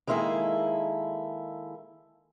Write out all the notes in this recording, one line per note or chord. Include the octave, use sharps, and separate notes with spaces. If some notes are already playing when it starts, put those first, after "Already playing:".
D#3 G#3 A#3 E4 G#4 A4